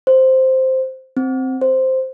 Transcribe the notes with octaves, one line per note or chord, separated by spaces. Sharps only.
C5
C4
C5